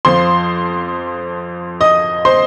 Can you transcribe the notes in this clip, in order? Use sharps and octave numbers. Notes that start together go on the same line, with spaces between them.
F2 F3 C5 C6
D#5 D#6
C5 C6